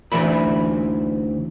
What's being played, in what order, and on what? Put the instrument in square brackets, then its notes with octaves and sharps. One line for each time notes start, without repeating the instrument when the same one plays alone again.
[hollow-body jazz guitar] D2 G2 E3 E5 B5